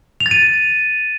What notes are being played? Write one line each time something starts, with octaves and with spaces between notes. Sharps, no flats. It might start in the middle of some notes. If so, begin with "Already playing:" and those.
F7
A6
D#7